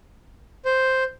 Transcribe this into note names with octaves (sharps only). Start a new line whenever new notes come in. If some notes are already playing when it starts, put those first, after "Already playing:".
C5